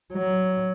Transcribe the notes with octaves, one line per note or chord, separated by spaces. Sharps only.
F#3